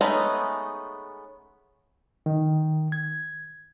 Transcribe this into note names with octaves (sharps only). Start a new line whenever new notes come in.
G#3 A3 B3 C#4 D#4
D#3
G#6